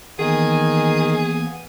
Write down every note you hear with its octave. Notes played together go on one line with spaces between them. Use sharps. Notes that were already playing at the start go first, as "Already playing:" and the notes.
D#3 E3 A#3 B3 G#4 G#5 D#6